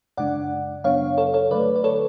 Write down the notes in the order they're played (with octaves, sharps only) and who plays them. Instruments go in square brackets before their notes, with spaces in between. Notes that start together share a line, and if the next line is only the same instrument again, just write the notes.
[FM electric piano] F#2 C#3 G#3 D4 D5 F#5
F#2 C#3 F#3 B3 D4 C#5 F5
A4 C#5
A4 C#5
D3 F#3 A3 B4 D5
D5
A4 C#5